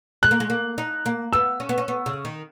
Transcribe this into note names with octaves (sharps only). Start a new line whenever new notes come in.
G#3 F#6
A#3
G#3
A#3
D#4
A#3
B3 E6
C#4
B3
C#4
B3
C#3
D#3